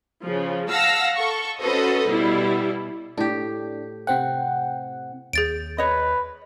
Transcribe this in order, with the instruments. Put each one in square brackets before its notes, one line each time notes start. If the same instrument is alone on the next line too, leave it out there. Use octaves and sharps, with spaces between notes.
[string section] C#3 F3
F5 F#5 A5 E6 A#6
A4 C#6
C#4 F#4 A4 B4 C5 D#5
B2 G3 E4
[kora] A2 G4 [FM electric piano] D4
[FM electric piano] C3 C4 F#5 [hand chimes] G5
[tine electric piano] D#2 G6 [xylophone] G#4 A6 D7
[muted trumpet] B4 [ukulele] C#5 D#5